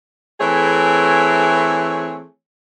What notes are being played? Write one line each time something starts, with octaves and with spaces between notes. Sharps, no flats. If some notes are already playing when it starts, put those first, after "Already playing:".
E3 A3 C4 G#4 C#5